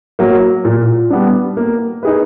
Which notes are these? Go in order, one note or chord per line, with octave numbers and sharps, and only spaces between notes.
F#3 A#3
A#2
G3 B3 D4
A#3
D#4 G#4 B4